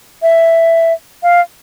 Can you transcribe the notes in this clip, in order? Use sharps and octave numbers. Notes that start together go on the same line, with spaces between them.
E5
F5